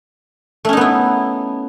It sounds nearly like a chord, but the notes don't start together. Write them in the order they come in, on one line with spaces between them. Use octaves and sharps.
A3 C#4 D#4 B3 E4